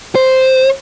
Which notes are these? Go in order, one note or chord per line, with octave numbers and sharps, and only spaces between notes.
C5